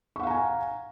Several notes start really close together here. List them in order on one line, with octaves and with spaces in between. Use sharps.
C#6 F#5 F5 A#5 G#5